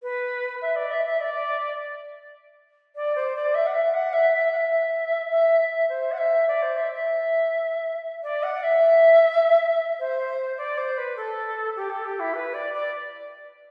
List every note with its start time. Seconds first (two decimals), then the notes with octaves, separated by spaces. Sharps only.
0.02 B4
0.61 E5
0.75 D5
0.90 E5
1.05 E5
1.20 D5
2.95 D5
3.15 C5
3.35 D5
3.54 E5
3.66 F#5
3.74 E5
3.94 F#5
4.13 E5
4.33 E5
4.52 F#5
4.56 E5
5.30 E5
5.59 E5
5.89 C5
6.12 F#5
6.17 E5
6.47 D5
6.62 C5
6.76 E5
6.91 E5
8.22 D5
8.43 F#5
8.63 E5
9.99 C5
10.57 D5
10.77 C5
10.97 B4
11.16 A4
11.75 G4
11.89 A4
12.04 G4
12.19 E4
12.34 B4
12.53 D5
12.73 D5